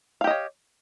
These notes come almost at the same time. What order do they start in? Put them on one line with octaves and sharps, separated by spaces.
F5 G4 D#5 C#5